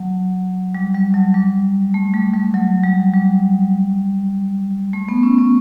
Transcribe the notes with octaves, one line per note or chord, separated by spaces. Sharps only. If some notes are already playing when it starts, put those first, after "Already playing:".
Already playing: F#3
G3
G3
F#3
G3
A3
G3
G3
F#3
G3
G3
A3
B3
C#4
B3